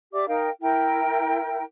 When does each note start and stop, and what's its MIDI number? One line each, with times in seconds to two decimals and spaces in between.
0.12 0.27 67
0.12 0.27 74
0.12 0.27 76
0.12 0.27 86
0.27 0.49 63
0.27 0.49 70
0.27 0.49 77
0.27 0.49 79
0.61 1.63 64
0.61 1.63 70
0.61 1.63 79